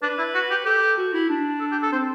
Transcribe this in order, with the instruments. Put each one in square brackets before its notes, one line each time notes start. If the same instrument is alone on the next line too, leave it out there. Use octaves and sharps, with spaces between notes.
[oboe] D4 [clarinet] B4
[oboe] E4
F#4
G4
[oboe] G4 [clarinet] A4
[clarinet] F#4
E4
D4
[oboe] A4
G4
A4
[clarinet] C4 [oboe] C5